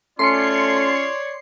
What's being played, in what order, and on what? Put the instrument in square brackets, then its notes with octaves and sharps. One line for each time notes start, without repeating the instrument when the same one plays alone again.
[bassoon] A3 [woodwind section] C#4 F4 [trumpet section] C#5 D5 [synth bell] C6 C7 C#7